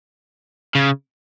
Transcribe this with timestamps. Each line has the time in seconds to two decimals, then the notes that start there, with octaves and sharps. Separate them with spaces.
0.75 C#3